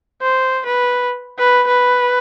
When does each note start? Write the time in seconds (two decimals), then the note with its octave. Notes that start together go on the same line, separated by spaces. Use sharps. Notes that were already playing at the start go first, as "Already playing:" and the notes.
0.21 C5
0.66 B4
1.39 B4
1.67 B4